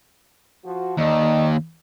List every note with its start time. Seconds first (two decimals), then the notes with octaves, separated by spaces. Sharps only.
0.65 F3 F#4
0.98 D#2 A4 D5 D#5